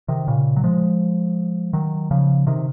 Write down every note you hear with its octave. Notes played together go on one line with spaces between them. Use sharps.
C3 D#3
A#2 C#3
F#3
F3 G#3
D#3 F#3
C#3 F3
C3 D#3